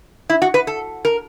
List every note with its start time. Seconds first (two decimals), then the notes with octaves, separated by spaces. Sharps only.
0.30 E4
0.42 F#4
0.54 B4
0.67 A4
1.05 A#4